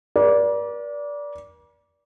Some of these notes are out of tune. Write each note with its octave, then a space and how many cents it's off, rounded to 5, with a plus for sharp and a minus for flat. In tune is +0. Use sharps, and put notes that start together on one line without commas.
A#4 +45 D5 -15